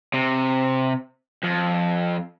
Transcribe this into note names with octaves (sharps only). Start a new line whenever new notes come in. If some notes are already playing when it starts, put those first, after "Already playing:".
C3
F2